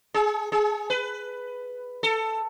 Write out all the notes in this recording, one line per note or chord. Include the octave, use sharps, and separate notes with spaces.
G#4
G#4
B4
A4